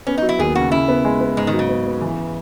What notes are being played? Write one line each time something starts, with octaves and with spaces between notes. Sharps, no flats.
B3 C#4
F#3 D#4
E4
D#2 G#4
C#3 F#4
C#3 E4
B3
G#3
B3
G#2 G#3
D#3
F#3
C#3
B3
B3
E3